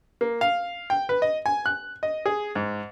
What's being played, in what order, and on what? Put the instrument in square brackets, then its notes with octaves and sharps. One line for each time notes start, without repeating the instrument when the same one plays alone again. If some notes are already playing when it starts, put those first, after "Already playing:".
[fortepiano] A#3
F5
G5
B4
D#5
G#5
F#6
D#5
G#4
G#2